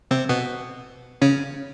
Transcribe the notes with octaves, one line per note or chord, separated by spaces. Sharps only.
C3 C4
B2 B3
C#3 C#4